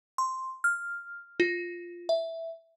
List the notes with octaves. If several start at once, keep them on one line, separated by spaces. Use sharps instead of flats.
C6
F6
F4
E5